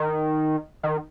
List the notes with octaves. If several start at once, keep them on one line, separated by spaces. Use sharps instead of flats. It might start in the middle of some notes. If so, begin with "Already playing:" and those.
Already playing: D#3
D#3